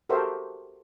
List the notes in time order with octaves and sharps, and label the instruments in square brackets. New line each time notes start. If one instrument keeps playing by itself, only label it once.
[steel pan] F#4 G4 A4 A#4 C5 E5